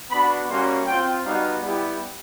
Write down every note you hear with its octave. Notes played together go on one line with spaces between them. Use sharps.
B3 D4 F#4 B5
G3 A#3 C#4 F#4 C6
C4 F4 G5
G3 B3 D#4 F#4 F5
G3 B3 E4 G4